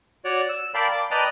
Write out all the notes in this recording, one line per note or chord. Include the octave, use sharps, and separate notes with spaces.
F#4 C#5 D5
E6
A#4 D5 F5 G5 A5 B5
D6
B4 D5 D#5 G5 A5 A#5